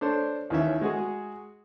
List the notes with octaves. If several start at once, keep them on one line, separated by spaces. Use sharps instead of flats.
D4 A4 C5 C#5
D#2 E3 C#4 E5
G#3 F#4 G#4